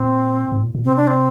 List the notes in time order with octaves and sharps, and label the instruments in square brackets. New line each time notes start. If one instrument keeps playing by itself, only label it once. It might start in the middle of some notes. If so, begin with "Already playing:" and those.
Already playing: [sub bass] A#2 [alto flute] C4
[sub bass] G#2
A#2
A#2
[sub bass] C3 [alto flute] C4
[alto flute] D4
C4